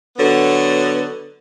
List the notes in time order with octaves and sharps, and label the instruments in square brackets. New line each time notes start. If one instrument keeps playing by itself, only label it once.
[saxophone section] D3 F#3 B3